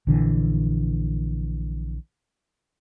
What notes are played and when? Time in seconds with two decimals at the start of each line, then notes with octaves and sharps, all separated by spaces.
0.07 A#1 D3 E3